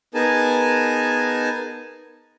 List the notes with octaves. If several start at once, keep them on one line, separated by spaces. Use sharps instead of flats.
B3 D#4 G#4 A#4 G#5 A5